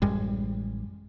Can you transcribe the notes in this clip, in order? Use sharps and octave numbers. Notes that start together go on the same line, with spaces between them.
A1 F#2 G3 G#3